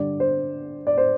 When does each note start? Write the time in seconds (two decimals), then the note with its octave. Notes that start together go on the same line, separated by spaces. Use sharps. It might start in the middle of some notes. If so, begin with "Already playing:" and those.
Already playing: G2 D3 G3 D5
0.20 C5
0.87 D5
0.98 C5